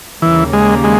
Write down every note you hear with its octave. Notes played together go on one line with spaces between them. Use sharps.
D#2 C#3 E3 G3 A#3
G#3
G#3